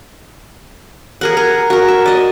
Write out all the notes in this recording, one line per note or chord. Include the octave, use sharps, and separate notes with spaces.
G#4 A#4 F#5
A#4
F#4 A#4
E5
D5 D#5